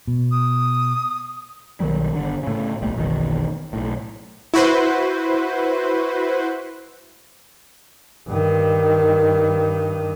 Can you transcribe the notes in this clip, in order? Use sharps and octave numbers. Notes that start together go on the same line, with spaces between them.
B2
D#6
B1 D#3 F#3 G3
G1 D3
A2 C#3
D1 B1 G3 A3
F#1 B1 E2 D#3
B1 A2
E4 F#4 B4 C5
G2 D#3